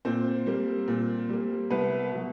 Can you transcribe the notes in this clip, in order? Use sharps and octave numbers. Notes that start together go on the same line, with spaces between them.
A#2 C4 C5
G3 A#3
A#2
G3 A#3
C2 B3 B4
B2 F#3